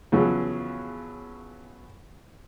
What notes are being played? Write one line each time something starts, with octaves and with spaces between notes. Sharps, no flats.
E2 C#3 F3 F#3